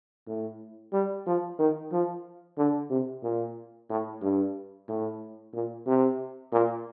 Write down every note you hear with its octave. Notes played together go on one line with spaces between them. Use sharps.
A2
G3
F3
D#3
F3
D3
C3
A#2
A2
G2
A2
A#2
C3
A#2